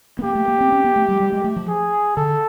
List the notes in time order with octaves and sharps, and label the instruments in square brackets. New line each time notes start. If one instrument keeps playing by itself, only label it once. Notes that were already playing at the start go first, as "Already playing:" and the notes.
[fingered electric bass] B3
[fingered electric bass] A#3 [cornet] G4
[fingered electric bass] A3
A#3
C4
C#4
B3
A3
G3
G3
G#3
A3
F3
[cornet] G#4
[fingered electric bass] D3 [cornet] A4